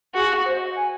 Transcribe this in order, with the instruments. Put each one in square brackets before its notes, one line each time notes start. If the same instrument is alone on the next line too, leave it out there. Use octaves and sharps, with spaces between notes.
[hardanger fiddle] F#4 [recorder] G#4
[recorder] C5
D#5
F#5
G#5